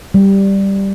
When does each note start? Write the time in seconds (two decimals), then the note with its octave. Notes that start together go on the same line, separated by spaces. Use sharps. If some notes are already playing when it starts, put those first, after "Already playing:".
0.14 G3